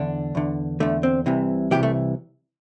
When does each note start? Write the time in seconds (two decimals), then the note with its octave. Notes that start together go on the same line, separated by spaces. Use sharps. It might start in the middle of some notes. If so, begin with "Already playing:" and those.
Already playing: E2 D3 D4
0.35 E2 D3
0.80 E2 D3 A3
1.03 C4
1.26 C2 C3 E3
1.71 C2 C3 E3 G4
1.83 A3